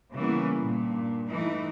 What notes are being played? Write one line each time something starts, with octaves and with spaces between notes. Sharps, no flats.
C#3 E3 G3 A#3 B3
G2 A#2
E3 A3 D#4